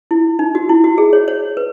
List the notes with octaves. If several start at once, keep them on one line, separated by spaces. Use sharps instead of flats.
E4
D#4
F#4
E4
F#4
G#4
C#5
C#5
B4